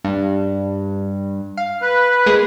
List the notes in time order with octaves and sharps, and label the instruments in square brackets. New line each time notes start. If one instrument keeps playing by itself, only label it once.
[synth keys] G2
F5
[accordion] B4
[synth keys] G#3 A#3 G#4